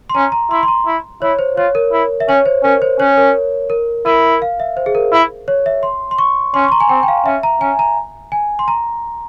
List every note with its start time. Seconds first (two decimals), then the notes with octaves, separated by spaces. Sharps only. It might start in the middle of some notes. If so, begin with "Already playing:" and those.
0.10 C6
0.15 C#4 A#5
0.32 A#5
0.51 E4 C6
0.63 C6
0.68 A#5
0.86 E4
1.22 E4 C#5
1.39 C5
1.57 F4 C#5
1.75 A#4
1.92 E4
2.20 E5
2.28 C#4 C#5
2.46 C5
2.63 C#4 A#4
2.82 C5
2.99 C#4 C#5
3.17 A#4
3.70 A#4
4.05 E4 A#4
4.42 F5
4.60 E5
4.77 C5
4.86 G#4
4.95 A#4
5.12 E4
5.48 C#5
5.66 E5
5.83 C6
6.11 C6
6.18 C#6
6.54 C#4 C6
6.64 C#6
6.68 C6
6.72 A#5
6.80 G#5
6.89 C4 G5
7.03 G5
7.08 F5
7.26 C#4 E5
7.43 A#5
7.61 C#4 G#5
7.79 A#5
8.32 G#5
8.59 C6
8.68 A#5